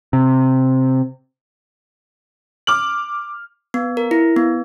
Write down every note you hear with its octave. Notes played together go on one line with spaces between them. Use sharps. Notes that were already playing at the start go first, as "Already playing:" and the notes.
C3
D6 F6 F#7
B3
A#4
E4
B3